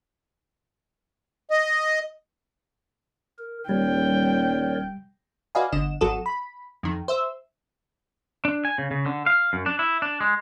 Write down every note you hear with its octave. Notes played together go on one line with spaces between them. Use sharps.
D#5
A#4
D#1 G3 A#4 C#5 D5 G5
F#4 B4 D5 D#5 F5 G#5
G1 D3 D#5 E7
G#1 F#3 F#4 A4 D#6 E7
B5
F2 D#3
C5 E5 E6
D4
G#5
C#3
C#3
D3
F5
F#2
D4
E4
D4
G#3